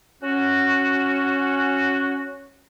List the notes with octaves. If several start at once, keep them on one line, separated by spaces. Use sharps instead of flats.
C#4 F#4